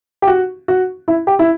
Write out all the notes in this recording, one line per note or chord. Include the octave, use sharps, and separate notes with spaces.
G4
F#4
F#4
E4
G4
E4